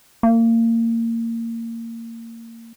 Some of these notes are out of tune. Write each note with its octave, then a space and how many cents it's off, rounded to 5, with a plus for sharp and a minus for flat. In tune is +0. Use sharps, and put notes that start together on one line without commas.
A#3 -25